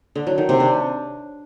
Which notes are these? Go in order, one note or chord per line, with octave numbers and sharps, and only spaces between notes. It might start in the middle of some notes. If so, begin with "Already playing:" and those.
D3
F#3
D#3
C3
D4